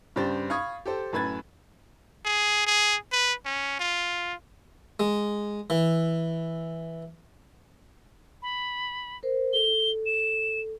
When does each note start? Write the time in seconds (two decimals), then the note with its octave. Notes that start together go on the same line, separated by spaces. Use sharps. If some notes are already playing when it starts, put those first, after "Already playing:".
0.16 G2 C#3 G4 C5 A6
0.50 F5 B5 C#6 D#6 G#6
0.86 G4 A4 C5
1.13 F#2 A2 B4 B5 G#6 A6
2.25 G#4
2.66 G#4
3.12 B4
3.45 C#4
3.80 F4
5.00 G#3
5.70 E3
8.42 B5
9.23 A#4 C5
9.53 A4 G7
10.06 E7